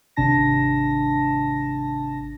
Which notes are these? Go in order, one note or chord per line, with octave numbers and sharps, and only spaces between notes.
G#1 C3 D4 A5 A#6